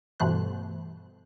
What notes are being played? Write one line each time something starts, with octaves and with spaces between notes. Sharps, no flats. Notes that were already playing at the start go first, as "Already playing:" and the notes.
G2 B2 E3 A3 C5 F#6